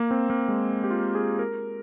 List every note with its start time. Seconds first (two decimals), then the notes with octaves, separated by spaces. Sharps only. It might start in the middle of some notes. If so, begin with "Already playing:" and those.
Already playing: A#3
0.11 C4
0.30 A#3
0.48 G#3
0.84 G4
0.91 F4
1.15 G#4
1.39 A#4